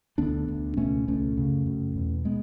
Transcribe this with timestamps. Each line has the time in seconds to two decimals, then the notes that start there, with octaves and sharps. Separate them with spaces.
0.18 D2 D3 B3 D4
0.48 D2 D3
0.77 C#2 B2 A3 C#4
1.08 C#2 B2 A3 C#4
1.37 F#2 C#3
1.66 F#2 C#3
1.96 E2 B2
2.25 G#3 B3